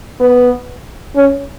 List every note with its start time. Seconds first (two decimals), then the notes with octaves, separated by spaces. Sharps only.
0.20 B3
1.16 C#4